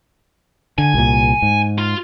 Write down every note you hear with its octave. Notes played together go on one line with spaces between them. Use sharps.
D3 G#5
C2 A#2
G#2
F4